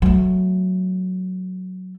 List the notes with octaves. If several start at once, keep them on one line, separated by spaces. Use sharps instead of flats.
F#3 A3